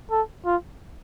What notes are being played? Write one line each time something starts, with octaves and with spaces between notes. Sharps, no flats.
A4
F4